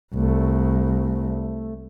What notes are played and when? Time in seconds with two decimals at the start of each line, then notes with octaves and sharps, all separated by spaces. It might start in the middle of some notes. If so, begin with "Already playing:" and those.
0.14 C2 A3